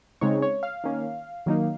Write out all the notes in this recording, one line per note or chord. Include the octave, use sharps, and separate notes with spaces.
C#3 G#3 C4 D#4 C#5
C#5
F5
D#3 A#3 C#4
D#3 F#3 A#3 D#4